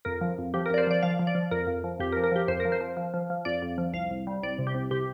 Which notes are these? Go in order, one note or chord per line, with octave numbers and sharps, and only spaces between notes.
F2 A#4
F3
F2
F3 G4
A#4
F2 D5
C5
F3 D5
F3 F5
F3
D5
F3
F2 A#4
F2
F3
F2 G4
A#4
F3
A#4
F3 G4
F2 C5
A#4
F3
C5
F3
F3
F3
F3
F2 D5
F2
F3
C2 F5
C2
G3
C2 D5
C3
G4
C2
C3 G4